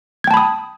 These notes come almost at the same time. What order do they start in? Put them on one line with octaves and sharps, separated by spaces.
G#6 G5 A5 B5 D#6